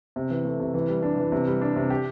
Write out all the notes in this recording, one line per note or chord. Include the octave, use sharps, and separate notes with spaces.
C3
E3
A3
C3
E3
G3
D4
E3
C3
G3
D4
C3
G4